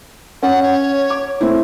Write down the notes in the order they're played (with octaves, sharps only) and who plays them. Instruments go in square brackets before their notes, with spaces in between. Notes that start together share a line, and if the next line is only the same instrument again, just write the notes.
[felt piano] C#4 [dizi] F#5
[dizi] C#5
[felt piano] D6
A3 C4 E4